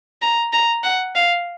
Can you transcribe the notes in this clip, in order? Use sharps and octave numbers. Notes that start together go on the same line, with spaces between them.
A#5
A#5
F#5
F5